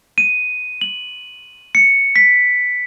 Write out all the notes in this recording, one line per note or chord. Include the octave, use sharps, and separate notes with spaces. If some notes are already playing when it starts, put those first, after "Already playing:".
D#7
F#7
C#7
B6